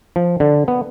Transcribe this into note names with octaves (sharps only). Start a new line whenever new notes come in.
F3
D3
B3